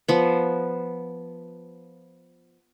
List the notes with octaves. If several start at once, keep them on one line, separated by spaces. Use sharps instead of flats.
F3 B3